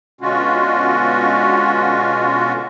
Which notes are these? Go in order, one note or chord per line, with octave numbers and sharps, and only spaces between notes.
B2 D3 G#3 C#4 F4 F#4